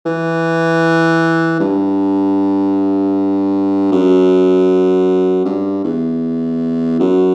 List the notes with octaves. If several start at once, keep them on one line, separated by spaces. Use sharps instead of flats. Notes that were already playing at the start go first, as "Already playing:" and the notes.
E3
G2
F#2
G2
E2
F#2